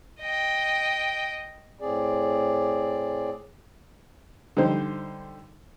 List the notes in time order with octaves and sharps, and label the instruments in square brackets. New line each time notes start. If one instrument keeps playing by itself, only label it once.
[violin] D#5 G5
[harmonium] A2 C4 G#4 D5
[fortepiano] D3 G3 D#4 C5